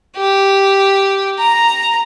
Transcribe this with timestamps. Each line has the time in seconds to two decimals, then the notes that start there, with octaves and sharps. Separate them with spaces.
0.17 G4
1.39 A#5